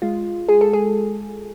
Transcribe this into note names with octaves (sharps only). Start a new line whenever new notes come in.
G#3 F4
G#3 G#4
A4
G#4